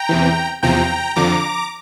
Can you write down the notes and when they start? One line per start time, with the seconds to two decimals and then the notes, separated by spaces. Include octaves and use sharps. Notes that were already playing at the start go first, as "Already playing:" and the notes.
Already playing: G5 A#5
0.09 E2 C3 E3
0.63 E2 C3 F3 G5 A#5
1.16 F2 D3 F3 A#5 D6